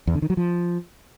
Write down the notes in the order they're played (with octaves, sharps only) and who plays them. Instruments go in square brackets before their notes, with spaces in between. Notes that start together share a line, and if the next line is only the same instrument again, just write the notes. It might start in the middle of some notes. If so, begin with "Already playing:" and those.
[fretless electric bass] E2
D3
D#3
F#3
F3